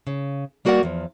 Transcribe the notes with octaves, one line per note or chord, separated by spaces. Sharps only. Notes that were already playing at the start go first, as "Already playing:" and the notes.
C#3
G3 A#3 F#4 A#4 D5 F#5
E2 F3